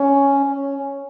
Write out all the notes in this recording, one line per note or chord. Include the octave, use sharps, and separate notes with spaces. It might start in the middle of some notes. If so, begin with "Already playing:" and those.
Already playing: C#4
C#4